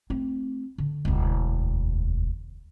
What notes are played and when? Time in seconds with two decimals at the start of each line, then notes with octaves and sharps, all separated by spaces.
0.10 A3 C4
0.78 D3
1.05 E1 D2